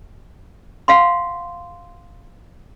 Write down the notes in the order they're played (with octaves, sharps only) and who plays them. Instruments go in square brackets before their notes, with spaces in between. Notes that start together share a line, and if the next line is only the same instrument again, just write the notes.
[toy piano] F5 F#5 C6